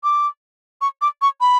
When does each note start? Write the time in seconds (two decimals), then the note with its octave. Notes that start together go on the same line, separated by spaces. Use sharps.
0.04 D6
0.81 C#6
1.02 D6
1.22 C#6
1.41 B5